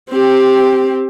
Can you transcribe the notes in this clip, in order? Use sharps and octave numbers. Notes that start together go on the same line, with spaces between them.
C4 G4